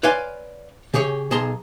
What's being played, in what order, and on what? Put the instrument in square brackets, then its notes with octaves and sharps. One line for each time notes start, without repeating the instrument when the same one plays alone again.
[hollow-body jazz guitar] B4 C#5 D5 F5 G#5 C6
C#3 G4 G#4 C#5
B1 G#4 A5 A#5 C6